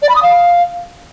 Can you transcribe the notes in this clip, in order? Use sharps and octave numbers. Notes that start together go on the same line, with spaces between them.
D5
B5
D#6
F5